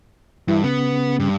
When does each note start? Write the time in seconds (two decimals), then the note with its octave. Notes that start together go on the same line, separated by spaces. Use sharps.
0.48 G2 E3 E4
0.64 C#3 B3
1.20 G2